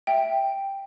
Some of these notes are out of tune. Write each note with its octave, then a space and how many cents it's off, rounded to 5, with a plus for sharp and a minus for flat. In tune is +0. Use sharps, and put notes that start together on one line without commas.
E5 +0 G5 +0